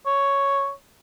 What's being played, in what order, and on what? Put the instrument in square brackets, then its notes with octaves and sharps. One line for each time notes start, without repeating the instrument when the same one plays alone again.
[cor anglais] C#5